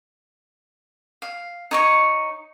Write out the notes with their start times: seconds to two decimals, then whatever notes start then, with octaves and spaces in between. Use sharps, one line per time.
1.22 F5
1.71 D#4 C#5 C#6